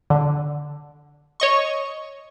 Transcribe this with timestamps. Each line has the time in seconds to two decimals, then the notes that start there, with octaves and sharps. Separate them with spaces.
0.10 D3
1.40 C#5 D#5 C#6